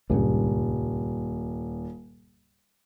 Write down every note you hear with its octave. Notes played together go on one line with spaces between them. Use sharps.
D#1 C#2 G2 C#3